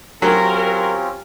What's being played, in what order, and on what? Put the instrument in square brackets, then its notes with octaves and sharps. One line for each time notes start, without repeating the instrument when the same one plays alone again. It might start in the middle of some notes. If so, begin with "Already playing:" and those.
[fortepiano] F#3 [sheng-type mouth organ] C4 C#4 F4 [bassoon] G4 [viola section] A#4